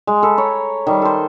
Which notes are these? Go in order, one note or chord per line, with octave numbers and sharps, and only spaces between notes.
G#3
A4 B4
C#5 A#5
D#3 G3
A4 C5